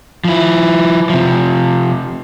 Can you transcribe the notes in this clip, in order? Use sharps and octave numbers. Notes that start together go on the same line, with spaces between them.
F3 E4
C3 F3